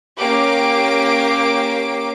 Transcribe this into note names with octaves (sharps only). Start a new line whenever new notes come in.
A#3 C#4 G4 D6 D7